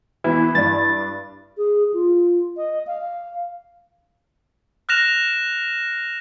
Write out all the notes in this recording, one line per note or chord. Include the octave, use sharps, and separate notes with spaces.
E3 B3 E4
G2 D4 A6
G#4
F4
D#5
F5
F6 F#6 A#6 E7 F7